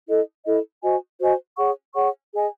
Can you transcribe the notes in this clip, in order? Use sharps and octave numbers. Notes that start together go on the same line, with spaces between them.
E4 A4 D#5
E4 A4 D#5
F#4 C5 D#5 G#5
F#4 C5 D#5 G#5
G#4 C#5 F#5 C#6
G#4 C#5 F#5 C#6
G#4 D#5 G#5